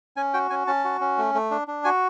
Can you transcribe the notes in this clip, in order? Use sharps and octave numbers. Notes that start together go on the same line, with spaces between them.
C#4 G#5
F#4 G5
C#4 G#5
C#4 A5
F#4
C#4
A3
A3
D4
D4
F#4 G#5